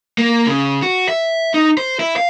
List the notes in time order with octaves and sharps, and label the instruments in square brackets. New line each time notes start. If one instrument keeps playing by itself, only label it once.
[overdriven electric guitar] A#3
C#3
F#4
E5
D#4
C5
E4
F5